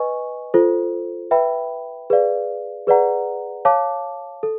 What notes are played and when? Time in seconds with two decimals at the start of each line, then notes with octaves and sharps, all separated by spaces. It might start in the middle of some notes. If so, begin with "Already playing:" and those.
Already playing: B4 D#5 G#5 C#6
0.54 F4 A4 C5
1.31 B4 E5 G5 B5
2.10 G#4 B4 D5 F5
2.87 G#4 B4 D5 F#5 A#5
3.65 C#5 F5 A5 D6
4.43 A4